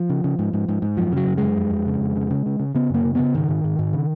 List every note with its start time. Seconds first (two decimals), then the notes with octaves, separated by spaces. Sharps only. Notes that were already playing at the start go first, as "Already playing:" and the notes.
Already playing: F3
0.09 C#3
0.24 C#3
0.39 G#2
0.53 G#2
0.68 G#2
0.82 G#2
0.97 F#2 F3
1.12 C#3 F#3
1.26 F#2
1.38 F#2 G#3
1.57 F2
1.71 F2
1.86 C#3
2.01 F2
2.16 C#3
2.30 C#3
2.46 C#3
2.60 C#3
2.75 C#3 B3
2.90 F#2 A#3
3.04 C#3
3.15 C#3 B3
3.35 G#2 D#3
3.48 G#2
3.64 G#2
3.79 G#2
3.93 C#3